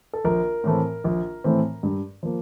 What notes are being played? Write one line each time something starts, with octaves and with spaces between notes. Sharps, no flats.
A4
A#1 A#4
A2 E3 A3 C4
A#1
A2 E3 A3 C4
G2
F3 A#3